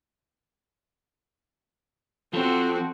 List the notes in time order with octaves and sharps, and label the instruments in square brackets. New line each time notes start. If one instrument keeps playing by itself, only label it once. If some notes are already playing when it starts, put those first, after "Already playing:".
[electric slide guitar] F3 F4 A4 [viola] C4 F#4